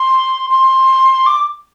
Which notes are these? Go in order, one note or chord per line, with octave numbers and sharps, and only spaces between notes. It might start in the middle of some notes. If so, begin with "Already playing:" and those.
Already playing: C6
C6
D6